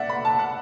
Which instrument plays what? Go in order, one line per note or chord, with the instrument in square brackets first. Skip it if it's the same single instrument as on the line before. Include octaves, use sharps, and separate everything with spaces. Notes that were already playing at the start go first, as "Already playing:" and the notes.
Already playing: [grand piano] D5 E5 F#5
B5
A5
F#5